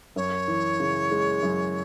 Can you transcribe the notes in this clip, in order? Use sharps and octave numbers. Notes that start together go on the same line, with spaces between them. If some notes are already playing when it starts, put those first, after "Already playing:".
F#2 C#5
E3
C#3
G#3
F#2